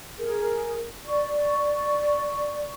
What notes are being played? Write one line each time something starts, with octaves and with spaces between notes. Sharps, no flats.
G#4 A#4
D5 C#6